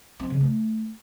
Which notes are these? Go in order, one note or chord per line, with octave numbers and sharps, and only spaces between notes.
C4
C#3
A3